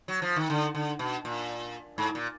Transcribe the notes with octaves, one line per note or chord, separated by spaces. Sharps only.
F#3
F3
D#3
D3
D3
B2
A#2
G#2
A#2